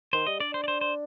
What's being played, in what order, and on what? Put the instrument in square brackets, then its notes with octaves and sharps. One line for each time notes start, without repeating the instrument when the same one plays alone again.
[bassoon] D#3 [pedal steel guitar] C5
[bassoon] G3 [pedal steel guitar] D#5
[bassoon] D4 [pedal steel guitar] D5
[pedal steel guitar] C5
D5
C5
C5